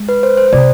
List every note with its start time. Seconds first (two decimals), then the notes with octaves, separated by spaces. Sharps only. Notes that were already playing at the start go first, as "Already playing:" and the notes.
Already playing: G#3
0.09 B4
0.23 C5
0.37 C5
0.48 C5
0.53 C3 D5